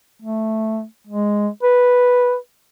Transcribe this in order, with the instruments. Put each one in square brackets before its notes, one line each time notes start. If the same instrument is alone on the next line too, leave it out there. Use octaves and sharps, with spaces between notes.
[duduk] A3
G#3
B4